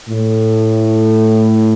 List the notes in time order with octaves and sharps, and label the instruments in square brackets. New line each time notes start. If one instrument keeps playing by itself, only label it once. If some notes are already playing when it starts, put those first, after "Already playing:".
[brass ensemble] A2